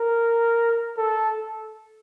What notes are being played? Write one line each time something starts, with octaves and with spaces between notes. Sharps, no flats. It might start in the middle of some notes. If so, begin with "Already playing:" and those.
Already playing: A#4
A4